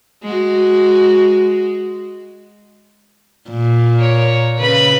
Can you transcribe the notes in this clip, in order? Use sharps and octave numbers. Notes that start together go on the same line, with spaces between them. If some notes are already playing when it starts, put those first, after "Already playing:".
G#3 F#4
A#2
A#4 C#5
C#3 B4 B5